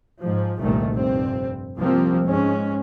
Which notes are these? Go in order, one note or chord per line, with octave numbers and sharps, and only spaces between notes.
G#2 F3
G1 C2 G2 A#2 D#3 A3
F1 G2 C4
C2 F3 A#3 C4
G#2 G#3 C#4